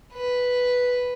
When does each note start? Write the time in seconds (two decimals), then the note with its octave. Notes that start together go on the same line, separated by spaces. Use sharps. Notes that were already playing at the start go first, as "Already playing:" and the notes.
0.14 B4